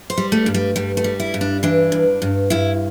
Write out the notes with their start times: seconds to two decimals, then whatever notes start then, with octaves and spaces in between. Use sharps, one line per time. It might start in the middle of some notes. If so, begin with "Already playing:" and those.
0.10 C5
0.17 G3
0.32 A3
0.46 G2
0.54 G3
0.76 G2 G3
0.97 A3
1.04 G3
1.20 E4
1.34 G2
1.41 D4
1.63 E3 D4
1.92 G2
2.22 G2
2.50 G2 E4